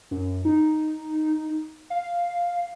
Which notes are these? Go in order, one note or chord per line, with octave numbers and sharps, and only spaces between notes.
F#2
D#4
F5